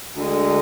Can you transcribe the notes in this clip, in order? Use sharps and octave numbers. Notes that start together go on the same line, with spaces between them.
D2 D3 G#3